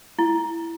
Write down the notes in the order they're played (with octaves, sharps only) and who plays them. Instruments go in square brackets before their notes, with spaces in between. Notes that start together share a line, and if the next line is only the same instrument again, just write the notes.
[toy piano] E4